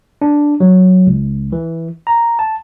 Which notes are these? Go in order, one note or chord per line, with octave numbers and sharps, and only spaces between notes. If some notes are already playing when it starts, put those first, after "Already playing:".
D4
F#3
C#2
E3
A#5
A5